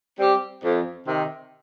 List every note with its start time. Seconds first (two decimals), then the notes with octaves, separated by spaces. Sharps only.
0.18 G3 C4 G4
0.63 F2
1.07 C3 D#3